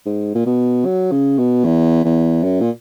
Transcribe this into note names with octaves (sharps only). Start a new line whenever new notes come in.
G#2
A#2
B2
F#3
C#3
B2
E2
E2
F#2
A#2